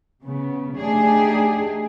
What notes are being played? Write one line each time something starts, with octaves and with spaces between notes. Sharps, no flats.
C#3 B3
A3 D4 D#4 G4 G#4